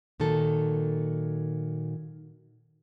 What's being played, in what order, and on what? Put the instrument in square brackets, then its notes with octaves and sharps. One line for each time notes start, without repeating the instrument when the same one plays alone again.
[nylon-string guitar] A#2 D#3 F#3 A4